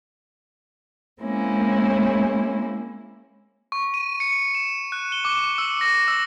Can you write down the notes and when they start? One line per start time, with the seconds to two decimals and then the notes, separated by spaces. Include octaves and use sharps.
1.22 G#3 A#3 C4 C#4 E4
3.72 C#6
3.94 D#7
4.20 C#7
4.55 E7
4.92 F#6
5.12 G7
5.25 D6
5.58 E6
5.81 A#6
6.08 E6